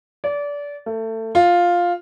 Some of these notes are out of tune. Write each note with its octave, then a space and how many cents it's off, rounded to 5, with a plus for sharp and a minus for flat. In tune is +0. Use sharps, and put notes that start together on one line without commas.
D5 -25
A3 +25
F4 +5